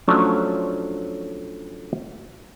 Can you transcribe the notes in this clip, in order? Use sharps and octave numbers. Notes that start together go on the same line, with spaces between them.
F3 F#3 A3 C#4 D4 C#5